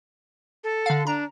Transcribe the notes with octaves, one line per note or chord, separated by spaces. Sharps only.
A4
D3 F5
D4 A#5